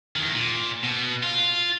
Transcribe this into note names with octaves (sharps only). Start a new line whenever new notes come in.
E2 D#3
A#2
B2
F4